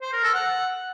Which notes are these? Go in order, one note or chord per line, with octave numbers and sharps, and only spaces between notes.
C5
A#4
A4
F#5